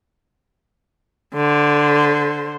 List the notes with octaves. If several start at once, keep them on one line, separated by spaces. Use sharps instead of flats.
D3 C5